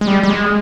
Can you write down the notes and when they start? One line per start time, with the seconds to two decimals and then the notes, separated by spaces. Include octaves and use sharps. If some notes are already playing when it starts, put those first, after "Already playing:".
0.01 G#3
0.07 G3
0.23 G3
0.29 G#3